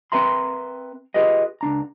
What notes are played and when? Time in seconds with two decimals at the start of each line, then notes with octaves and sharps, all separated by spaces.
0.12 C4 A#4 B4 E5 A#5 C6
1.14 F4 G4 G#4 B4 D#5
1.61 C#2 D4 A#5